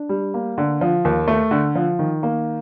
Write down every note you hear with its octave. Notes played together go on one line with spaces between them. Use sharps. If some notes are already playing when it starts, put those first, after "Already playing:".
Already playing: D4
G3
A#3
D3
F3
D#2
A3
D3
F3
D#3
A#3